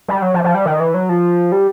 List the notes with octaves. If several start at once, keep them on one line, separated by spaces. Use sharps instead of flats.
G3
F#3
F3
F3
G3
D#3
E3
F#3
F3
G3